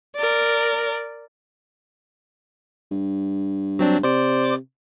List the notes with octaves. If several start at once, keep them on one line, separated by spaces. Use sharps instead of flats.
A#4 D5
G2
F#3 C4 D4
C3 C5 D5 D6